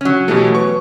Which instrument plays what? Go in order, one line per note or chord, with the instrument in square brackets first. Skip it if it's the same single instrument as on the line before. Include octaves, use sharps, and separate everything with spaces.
[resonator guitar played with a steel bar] F#3 C#4
[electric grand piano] B2 E3 A3 [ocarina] G4
[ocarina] B4 [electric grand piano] C#6